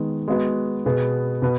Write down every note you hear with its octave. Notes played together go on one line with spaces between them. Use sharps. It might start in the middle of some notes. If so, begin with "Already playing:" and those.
Already playing: D#3 G#3 B3
G#3 B3 F#4 B4
B2 B3 G#4
B2 B3 B4